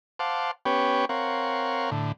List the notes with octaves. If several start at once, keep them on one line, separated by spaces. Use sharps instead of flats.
C5 F5 F#5 A5 D6
B3 C#4 G4 B4 C#5 G5
C4 A#4 C#5 F5 F#5
A2 D3